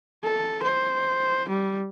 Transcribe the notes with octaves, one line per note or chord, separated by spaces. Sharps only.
A4
C5
G3